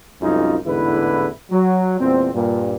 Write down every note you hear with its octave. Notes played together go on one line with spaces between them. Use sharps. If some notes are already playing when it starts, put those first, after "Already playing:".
C2 F#2 G#3 C#4 D#4 F4
A1 E2 G#2 D3 E4 B4
F#3
E2 A#2 G3 C4
G2 A#2